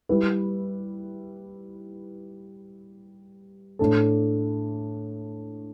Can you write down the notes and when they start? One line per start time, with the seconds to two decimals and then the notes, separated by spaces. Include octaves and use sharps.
0.09 G3 E4 B4
3.79 A2 A3 D4 A4